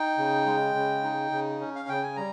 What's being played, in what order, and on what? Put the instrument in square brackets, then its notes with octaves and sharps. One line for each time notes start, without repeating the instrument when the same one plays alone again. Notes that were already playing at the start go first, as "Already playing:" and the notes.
Already playing: [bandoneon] D#4 G5
C#3
G#3
C#3
D#4
C#3
C#4
F5
C#3 G5
G#5
G3 A#5